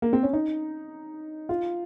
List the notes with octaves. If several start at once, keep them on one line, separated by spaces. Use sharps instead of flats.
A#3
C4
C#4
D#4
F4